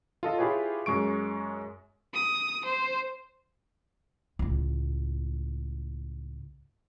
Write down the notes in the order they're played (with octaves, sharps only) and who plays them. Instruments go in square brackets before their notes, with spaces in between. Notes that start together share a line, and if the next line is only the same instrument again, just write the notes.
[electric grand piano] F4 A4 D#5
E4 F4 G4 G#4 B4 C#5
F#2 G#3 C#6 D7
[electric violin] D#6
C5
[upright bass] C#2 A2